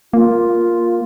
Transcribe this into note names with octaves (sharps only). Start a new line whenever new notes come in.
A#3 F4